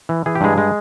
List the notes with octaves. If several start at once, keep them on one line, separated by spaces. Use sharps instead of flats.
E3
E3 G#4
G4
G2 G#3 G#4
G#3